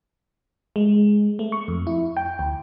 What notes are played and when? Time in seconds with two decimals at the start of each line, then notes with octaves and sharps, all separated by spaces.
0.76 G#3
1.39 A3
1.52 C#6
1.68 F2
1.87 E4
2.17 G5
2.39 D2